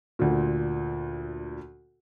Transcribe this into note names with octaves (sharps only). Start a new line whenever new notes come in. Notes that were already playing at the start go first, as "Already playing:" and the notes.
D2 A#2